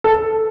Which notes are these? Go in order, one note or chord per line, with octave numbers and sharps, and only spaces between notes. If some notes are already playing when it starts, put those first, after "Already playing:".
A4